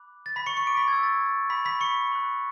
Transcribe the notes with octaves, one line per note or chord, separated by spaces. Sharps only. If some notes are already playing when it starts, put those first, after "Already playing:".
Already playing: B5 D6 F#6
A6
B5 B6
C#6 C#7
C#6 C#7
D6 D7
B5 B6
B5 E6 G#6
A6
B5 B6
B5 B6
C#6 C#7
B5 F#6